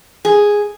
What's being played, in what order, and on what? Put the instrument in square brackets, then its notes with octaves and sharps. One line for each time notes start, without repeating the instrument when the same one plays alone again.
[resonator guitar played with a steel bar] G#4